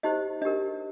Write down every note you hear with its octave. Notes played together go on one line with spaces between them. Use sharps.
D#4 G4 C5 D#5
D4 G4 A#4 D#5